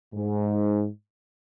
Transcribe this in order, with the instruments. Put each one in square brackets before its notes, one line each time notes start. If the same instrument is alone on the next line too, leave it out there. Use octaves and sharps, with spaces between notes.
[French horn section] G#2